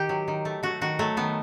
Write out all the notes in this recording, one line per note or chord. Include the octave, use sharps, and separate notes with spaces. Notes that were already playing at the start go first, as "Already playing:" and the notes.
Already playing: D#3 G4
F#3
D#3
A3
A3 F#4
D#3 F#4
F#3 A3
D#3 B3